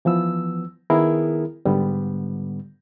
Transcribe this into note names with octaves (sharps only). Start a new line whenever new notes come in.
E3 F3 B3 E6
D#3 B3 E4 G#4 A#4
G#2 D3 G3 B3